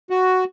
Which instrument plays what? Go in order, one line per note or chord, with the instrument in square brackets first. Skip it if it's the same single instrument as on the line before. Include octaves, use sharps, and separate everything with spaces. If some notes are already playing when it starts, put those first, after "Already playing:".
[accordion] F#4